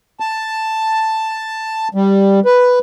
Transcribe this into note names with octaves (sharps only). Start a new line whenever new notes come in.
A5
G3
B4